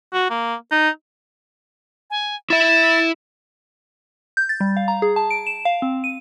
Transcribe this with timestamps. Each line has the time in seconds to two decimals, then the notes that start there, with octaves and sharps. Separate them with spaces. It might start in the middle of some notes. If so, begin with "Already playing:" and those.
0.13 F#4
0.30 A#3
0.71 D#4
2.10 G#5
2.50 E4 E5 A6
4.37 G6
4.49 A6
4.60 G3
4.77 F5
4.88 A#5
5.02 G#4
5.16 A5
5.31 D7
5.47 E7
5.65 F5
5.82 C4
6.04 D#7